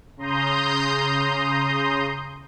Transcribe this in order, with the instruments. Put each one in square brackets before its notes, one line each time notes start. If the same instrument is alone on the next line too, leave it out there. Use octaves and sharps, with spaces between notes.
[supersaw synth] C#3 A#5 C6 D#6 G6